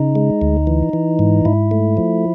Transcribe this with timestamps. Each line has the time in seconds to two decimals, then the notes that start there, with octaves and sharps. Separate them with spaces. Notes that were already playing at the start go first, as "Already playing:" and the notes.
Already playing: C#3 D#4
0.15 G#3
0.41 D2
0.67 E3
0.93 E3
1.19 G#2
1.45 G#2 E4
1.71 A3
1.97 F3